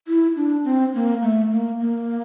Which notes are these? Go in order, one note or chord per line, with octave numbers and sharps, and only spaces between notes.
E4
D4
C4
A#3
A3
A#3
A#3